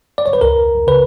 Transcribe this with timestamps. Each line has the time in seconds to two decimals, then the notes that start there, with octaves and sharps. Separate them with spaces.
0.18 D5
0.26 C#5
0.33 B4
0.41 C#2 A#4
0.87 C#3 B4